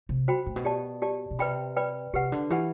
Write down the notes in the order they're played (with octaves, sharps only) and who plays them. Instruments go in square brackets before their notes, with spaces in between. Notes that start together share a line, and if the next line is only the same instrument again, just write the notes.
[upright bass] C3
[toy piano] F#4 C5 G5 B5
[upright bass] A2
B2
[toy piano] G4 D5 A5
G4 D5 A5
[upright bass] B2
[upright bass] C3 [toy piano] B4 D5 G5 B5
[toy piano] B4 D5 G5 B5
[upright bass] C3 [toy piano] G4 B4 F#5
[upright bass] D3
[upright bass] E3 [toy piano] G4 B4 F#5